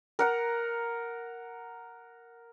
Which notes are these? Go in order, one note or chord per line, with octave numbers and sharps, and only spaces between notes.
A#4 F#5 A#5